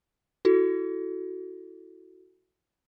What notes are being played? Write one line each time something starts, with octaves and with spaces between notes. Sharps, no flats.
E4 F#4 A4